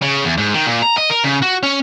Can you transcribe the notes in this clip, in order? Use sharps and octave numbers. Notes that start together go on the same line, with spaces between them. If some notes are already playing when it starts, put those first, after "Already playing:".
C#3
E2
G#2
D#3
A#2
A#5
D#5
A#4
C#3
F#4
C#4